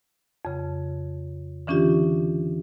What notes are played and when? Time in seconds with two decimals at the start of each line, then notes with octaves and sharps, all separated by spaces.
0.45 F2 C#3
1.67 D3 E3 C#4 D4 F4 G4